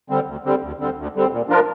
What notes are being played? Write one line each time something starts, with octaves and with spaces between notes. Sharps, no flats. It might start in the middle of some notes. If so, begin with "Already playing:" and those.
D3 G3 C4
D2
D3 G3 C4
D2
D3 G3 C4
D2
D3 G3 C4
A#2
F3 D4 F4 A#4